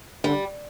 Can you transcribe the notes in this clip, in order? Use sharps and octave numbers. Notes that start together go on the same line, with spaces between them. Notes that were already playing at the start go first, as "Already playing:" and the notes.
D3 G3